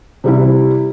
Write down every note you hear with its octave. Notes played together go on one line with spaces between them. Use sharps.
C3 G3 E4